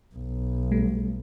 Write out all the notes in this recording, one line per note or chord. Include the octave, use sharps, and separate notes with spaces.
B1
G3 A3